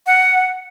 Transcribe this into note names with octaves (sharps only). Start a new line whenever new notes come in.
F#5